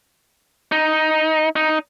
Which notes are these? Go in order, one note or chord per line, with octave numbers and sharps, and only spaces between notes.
D#4
D#4